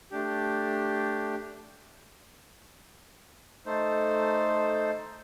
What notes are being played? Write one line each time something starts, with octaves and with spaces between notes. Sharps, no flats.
A3 D4 G4
A3 D#4 A4 C5